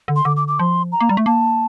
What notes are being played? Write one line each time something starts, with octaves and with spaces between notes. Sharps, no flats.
D3
C6
D3 D6
D6
D6
F3 C6
A#5
A#3
G3
A3
A#3 A5